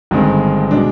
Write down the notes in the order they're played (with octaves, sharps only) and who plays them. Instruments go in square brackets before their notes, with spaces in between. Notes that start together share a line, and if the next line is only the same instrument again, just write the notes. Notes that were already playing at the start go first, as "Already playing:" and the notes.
[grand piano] G1 G2 D#3 G#3 C4
B2 G#3 D4